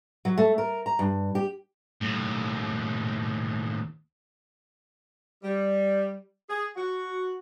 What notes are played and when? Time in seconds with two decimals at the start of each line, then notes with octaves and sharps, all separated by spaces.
0.25 F#3
0.38 A3
0.58 A#4
0.86 A#5
0.99 G2
1.35 G4
2.01 D#2 A2
5.43 G3
6.49 G#4
6.76 F#4